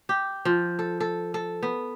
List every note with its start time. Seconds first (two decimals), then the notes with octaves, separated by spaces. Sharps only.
0.09 G4
0.45 F3
0.79 A4
1.00 A4
1.34 A4
1.63 B3